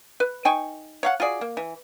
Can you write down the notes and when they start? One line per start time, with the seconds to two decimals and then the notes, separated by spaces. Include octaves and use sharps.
0.20 B4
0.45 D#4 G5 G#5 C#6
1.03 C#5 F5 F#5
1.20 F4 F#4 G#4 D5
1.41 A#3
1.57 E3